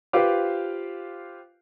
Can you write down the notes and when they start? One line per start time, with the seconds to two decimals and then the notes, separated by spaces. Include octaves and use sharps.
0.13 F4 G4 B4 C5 F5 D6